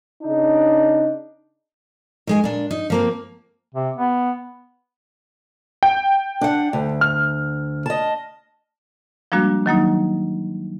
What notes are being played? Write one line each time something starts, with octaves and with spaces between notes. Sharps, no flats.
C#3 D4 D#4
D#3 G#3 G#5
A#2 D4
D#4
F3 A#3 C4
C3
B3
G5
D4 F#5
D2
F6
D#5 A5
F3 G3 G#3 A#3 D4 F#4
D#3 F#3 A#3 D#4